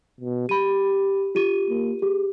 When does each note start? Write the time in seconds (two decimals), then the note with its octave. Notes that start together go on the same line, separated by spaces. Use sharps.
0.20 B2
0.49 G4 B5 D#7
1.35 F4 G4 D#7
1.69 A#3
2.02 G4 G#4